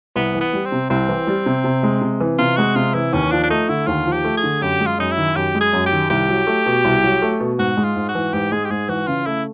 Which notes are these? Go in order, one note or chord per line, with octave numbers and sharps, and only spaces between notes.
C2 B3
E3
B3
G3
C4
C3
C2 C4
E3
G3
C3
C3
G#3
C3
E3
C3 F4
G#3 F#4
C3 F4
E3 E4
D#2 C#4
F3 D4
D4
A3 D#4
D3 E4
D#2 F4
F3
G4
A3
G#4
D3
F#2 G4
G#3
F4
F#2 D#4
E4
D#3
F#2 G4
G#3
G#4
F#2
G4
D#3
C2 G4
F#3
A3
B2
C2
F#3
A3
B2
G#2 F#4
G#3
F4
G#2
F#4
E3
G#2 G4
G#3 G#4
G4
G#2 G#4
E3 F#4
C#3 F4
A3 E4